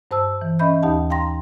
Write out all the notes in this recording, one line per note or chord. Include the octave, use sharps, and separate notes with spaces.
G2 C5 A5 E6
E3
C#4 D#5 E5 B5 G6
D#2 D#4 G4 F5 A5
F5 G5 A#5 C6 A#6